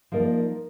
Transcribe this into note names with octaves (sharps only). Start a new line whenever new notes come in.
F3 A#3 D#4 A#4 D5